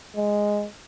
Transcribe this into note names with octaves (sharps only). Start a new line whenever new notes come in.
G#3